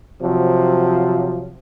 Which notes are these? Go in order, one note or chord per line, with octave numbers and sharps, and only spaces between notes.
C3 F3 F#3